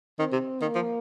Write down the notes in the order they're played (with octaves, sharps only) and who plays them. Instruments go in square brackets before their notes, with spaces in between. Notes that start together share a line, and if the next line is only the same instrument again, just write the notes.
[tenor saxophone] D#3 [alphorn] C4
[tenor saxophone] C3
[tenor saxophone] D#3 [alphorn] A#3
[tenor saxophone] F3